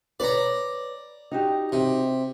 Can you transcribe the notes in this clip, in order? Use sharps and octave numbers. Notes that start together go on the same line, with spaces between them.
B4 C#5 D5 A#5
D#4 F#4 G4
C3